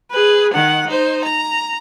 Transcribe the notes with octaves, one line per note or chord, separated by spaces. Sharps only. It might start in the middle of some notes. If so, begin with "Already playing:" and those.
G#4 B4
D#3 F#5
D#4 C5
A#5